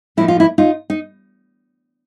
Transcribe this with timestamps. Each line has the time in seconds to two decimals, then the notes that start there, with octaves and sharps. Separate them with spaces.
0.17 A2 F3 A#3 D#4 E4
0.28 F4
0.40 E4
0.58 D#4 F4
0.90 D#4